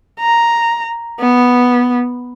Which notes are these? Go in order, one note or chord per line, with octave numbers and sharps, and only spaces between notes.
A#5
B3